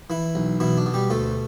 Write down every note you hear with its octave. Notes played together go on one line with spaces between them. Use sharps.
E3 E4
B1
B2 E3 E4
D4
B2
G3 G4
D2 A3 A4